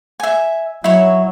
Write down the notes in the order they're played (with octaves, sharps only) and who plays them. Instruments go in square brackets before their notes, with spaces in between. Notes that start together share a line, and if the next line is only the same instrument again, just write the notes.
[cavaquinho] E5 G#5
[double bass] F#3 [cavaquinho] E4 C#5